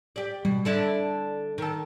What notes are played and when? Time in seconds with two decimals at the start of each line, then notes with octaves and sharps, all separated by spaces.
0.16 G4 D5
0.45 B2 G3
0.65 D3 D4 E4
1.58 D#3 A4